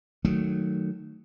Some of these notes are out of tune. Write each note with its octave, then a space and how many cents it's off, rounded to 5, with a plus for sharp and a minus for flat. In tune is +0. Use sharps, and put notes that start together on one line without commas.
D#3 -10 F#3 +0 A3 +0